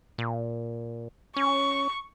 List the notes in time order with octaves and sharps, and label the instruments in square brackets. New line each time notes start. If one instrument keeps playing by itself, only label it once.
[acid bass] A#2
[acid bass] C#4 [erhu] C#6